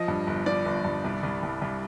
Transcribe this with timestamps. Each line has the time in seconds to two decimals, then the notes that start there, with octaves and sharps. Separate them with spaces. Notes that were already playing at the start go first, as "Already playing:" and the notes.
Already playing: F3 D#5
0.08 G2
0.27 G1
0.46 F3 D5
0.66 G1
0.85 G2
1.04 C2
1.23 C2
1.43 C2
1.62 C2